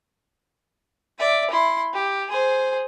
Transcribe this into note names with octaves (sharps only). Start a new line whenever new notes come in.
D5 E5
E4 C6
G4
G#4 C5